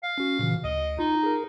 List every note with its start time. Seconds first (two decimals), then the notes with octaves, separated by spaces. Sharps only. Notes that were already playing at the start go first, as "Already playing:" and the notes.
0.03 F5
0.18 C#4 F#4
0.39 A#2 C#3 E3
0.64 D2 D#5
0.99 D#4 F4
1.23 G#4 A#4